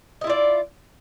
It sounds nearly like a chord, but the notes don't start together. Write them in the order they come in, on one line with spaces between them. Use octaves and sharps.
D#5 E4 F4 D5